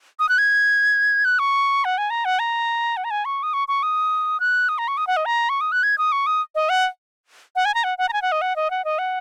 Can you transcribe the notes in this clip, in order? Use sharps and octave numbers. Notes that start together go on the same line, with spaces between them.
D#6
F#6
G#6
F#6
C#6
F#5
G#5
A#5
F#5
A#5
F#5
A#5
G#5
C#6
D#6
C#6
C#6
D#6
F#6
D#6
A#5
C#6
D#6
F#5
D#5
A#5
C#6
D#6
F#6
G#6
D#6
C#6
D#6
D#5
F#5
F#5
G#5
A#5
F#5
F#5
A#5
G#5
F#5
D#5
F#5
D#5
F#5
D#5
F#5